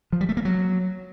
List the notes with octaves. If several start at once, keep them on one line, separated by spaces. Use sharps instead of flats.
F3
G3
A3
A#3
F#3